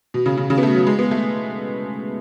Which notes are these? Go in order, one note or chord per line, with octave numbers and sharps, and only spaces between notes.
B2
C#3
C#3
C#3
B3
A3
F#3
G#3
B3
A3